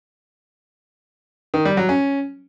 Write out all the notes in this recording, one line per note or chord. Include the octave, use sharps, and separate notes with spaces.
D#3
G3
F#3
C#4